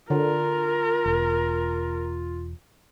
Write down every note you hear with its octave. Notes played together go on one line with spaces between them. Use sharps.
D3 F4 A#4
E1